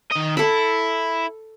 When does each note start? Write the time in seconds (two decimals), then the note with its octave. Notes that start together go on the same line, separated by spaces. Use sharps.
0.11 D#3 D#5
0.37 E4 A4 B5